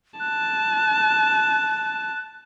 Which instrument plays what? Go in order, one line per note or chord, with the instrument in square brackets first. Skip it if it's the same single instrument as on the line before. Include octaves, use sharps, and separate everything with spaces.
[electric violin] A5 [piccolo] F#6